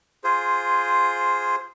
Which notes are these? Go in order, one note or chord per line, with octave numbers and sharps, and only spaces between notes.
F4 G#4 C5